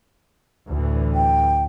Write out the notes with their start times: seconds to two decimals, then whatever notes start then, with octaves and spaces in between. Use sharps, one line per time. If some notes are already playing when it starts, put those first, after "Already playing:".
0.68 D2 A2 E3
1.15 G5